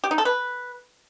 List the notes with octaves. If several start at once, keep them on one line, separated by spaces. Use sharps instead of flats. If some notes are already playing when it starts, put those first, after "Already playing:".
G4
D#4
A4
B4